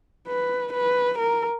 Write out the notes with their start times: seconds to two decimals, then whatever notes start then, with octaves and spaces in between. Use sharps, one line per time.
0.27 B4
0.73 B4
1.19 A#4